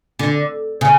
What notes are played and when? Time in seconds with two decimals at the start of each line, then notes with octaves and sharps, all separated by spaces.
0.19 D3
0.81 C#3